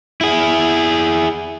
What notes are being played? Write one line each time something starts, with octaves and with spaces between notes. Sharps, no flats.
E4 G#4